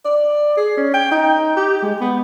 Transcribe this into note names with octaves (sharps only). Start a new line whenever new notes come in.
D5
G#4
C#4
G5
D#4
G4
G#3
B3